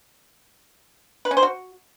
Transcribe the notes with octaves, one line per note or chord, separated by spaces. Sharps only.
B4
C#4
C5
F#4